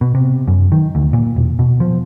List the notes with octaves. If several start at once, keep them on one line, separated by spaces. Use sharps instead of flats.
B2
C3
F#2
D#3
D2
A#2
E1
B2
F3